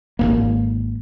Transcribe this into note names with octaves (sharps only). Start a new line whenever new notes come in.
G#1 F#2 A#3